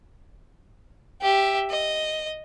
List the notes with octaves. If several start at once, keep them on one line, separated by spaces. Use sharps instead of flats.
G4 E5
D#5